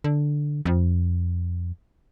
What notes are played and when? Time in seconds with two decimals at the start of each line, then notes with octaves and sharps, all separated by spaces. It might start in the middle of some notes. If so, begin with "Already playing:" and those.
0.04 D3
0.66 F2